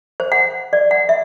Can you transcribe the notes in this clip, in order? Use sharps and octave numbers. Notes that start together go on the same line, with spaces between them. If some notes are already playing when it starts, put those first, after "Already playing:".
C5
F#5
D5
F#5
E5